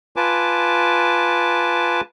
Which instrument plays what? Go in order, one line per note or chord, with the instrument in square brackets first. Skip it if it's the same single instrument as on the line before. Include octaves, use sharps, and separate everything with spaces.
[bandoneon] F4 B4 G#5 A5 D6